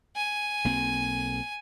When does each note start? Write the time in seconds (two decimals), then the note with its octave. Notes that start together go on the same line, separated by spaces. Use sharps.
0.16 G#5
0.65 B1 A#3 C4